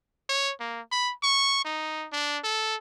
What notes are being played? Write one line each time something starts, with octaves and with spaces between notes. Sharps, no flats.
C#5
A#3
B5
C#6
D#4
D4
A4